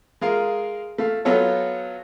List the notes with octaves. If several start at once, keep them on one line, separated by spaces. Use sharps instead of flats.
G#3 F4 G#4 A#4 F5
A3 F5
F#3 B3 F4 A4 C#5